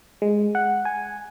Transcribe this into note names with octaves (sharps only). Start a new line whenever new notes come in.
G#3
F#5
G#5